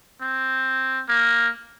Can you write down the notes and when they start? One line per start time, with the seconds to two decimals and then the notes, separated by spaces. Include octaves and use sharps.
0.22 C4
1.09 A#3